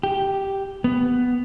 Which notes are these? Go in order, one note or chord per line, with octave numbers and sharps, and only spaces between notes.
G4
B3